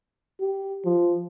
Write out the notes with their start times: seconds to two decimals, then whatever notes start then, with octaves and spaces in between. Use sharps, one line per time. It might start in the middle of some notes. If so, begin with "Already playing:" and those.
0.41 G4
0.85 F3